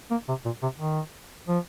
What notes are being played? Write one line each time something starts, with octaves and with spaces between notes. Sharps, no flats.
A#3
C3
A#2
C3
D#3
F3